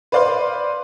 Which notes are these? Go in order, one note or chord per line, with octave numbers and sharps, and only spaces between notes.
B4 C5 D5 F5 C6